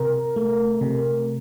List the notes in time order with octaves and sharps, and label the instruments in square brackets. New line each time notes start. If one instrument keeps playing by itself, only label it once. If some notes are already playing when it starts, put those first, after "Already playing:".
Already playing: [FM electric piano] C3 A#4
A3
C3